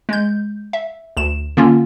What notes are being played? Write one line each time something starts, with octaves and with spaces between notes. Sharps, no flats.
G#3 G6
E5
D2 E7
D3 A#3 C#4 F4